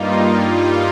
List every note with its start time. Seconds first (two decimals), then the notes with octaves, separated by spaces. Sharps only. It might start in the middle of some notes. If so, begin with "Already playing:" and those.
Already playing: G2 G3 A#3 D#4 F4
0.50 F4